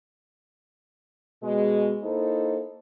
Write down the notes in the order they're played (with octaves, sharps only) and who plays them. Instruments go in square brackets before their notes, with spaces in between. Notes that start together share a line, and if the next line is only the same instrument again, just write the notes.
[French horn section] B2 G#3
A#3 D#4 E4 A4 C5